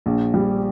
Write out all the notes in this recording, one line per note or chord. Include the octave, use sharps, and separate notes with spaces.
A#1
G3